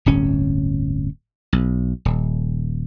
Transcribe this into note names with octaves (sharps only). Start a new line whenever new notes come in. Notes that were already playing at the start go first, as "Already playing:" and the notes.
D1 G1 C#4
B1
D#1